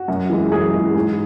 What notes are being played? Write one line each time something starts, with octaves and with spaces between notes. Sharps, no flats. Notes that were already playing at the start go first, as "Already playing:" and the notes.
Already playing: F#4
F#2
E3 G#3
F#2 G#4
E3 G#3
G#2